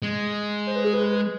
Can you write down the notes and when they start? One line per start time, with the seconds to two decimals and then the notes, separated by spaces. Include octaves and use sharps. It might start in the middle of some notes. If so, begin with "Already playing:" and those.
0.02 G#3
0.67 C5
0.76 B4
0.85 G#4
0.93 B4